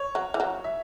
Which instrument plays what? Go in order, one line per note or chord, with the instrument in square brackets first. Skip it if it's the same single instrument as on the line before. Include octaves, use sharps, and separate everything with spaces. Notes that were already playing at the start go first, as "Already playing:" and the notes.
Already playing: [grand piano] C#5
[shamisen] F#3
E3
F#3
[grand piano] E5